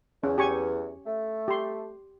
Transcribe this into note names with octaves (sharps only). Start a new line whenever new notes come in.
E2 C#4
G4 G#5 C#6
A3
G4 C6